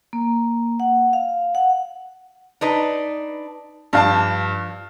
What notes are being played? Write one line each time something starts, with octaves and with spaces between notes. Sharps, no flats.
A#3
F#5
F5
F#5
D4 D#4 B4
G2 F3 D4 F5 A5